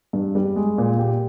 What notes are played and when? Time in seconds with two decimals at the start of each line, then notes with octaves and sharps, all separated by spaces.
0.13 G2
0.35 G3
0.56 G#3
0.78 A#2
0.99 G4